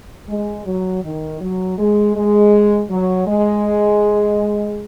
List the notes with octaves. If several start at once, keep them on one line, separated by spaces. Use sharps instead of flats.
G#3
F#3
D#3
F#3
G#3
G#3
F#3
G#3